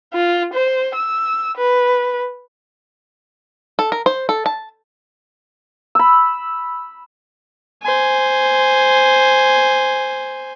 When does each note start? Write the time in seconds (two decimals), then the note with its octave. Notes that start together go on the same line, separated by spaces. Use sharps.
0.13 F4
0.54 C5
0.95 E6
1.57 B4
3.79 A4
3.92 A#4
4.06 C5
4.29 A4
4.46 A5
5.95 B5 E6
7.83 C5 G#5